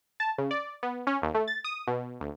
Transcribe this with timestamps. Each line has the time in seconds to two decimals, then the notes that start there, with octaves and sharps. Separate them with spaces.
0.20 A5
0.38 C#3
0.51 D5
0.83 B3
1.07 C#4
1.22 D#2
1.35 A3
1.48 A6
1.64 D#6
1.87 B2
2.20 D2